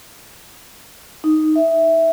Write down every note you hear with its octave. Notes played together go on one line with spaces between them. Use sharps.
D#4
E5